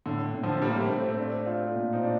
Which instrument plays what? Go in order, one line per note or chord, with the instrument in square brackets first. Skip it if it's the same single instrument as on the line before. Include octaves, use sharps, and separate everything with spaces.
[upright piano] A2 [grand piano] D3
[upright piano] A2
[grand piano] D3 F3
[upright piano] A2 [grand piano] G3 A#3
[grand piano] A3 C4
[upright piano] A2
[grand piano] A3 C4
[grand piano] A3 C4 [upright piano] D4
[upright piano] F4
A#2
[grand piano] C4 D#4
[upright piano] D4